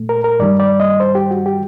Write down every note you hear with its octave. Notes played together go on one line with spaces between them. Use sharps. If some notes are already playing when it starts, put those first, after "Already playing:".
Already playing: A#2 A3
A#4
A#4
G2 D#3 G3 D5
D5
D#5
C5
G4
F#4
G4